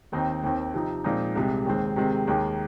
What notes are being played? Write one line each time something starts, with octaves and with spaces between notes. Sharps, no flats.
D#2 D#3 C4 D#4
D#2 D#3 C4
C3 F3 C4 D#4
A#2 F3 G#3 C4 D#4
C2 C3 G#3
D#2 D#3 G#3 C4
C3 D#3 G#3 C4
D#2 D#3 G#3